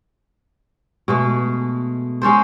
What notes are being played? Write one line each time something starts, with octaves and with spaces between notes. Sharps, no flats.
B2 G#3 A3
G#3 C#4 A4 C5